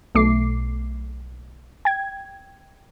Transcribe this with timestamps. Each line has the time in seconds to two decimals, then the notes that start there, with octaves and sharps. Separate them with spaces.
0.15 B1 A3 D6 C7
1.85 G5 G#6